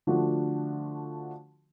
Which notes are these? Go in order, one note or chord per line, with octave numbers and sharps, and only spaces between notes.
D3 F3 A3 D4 F#4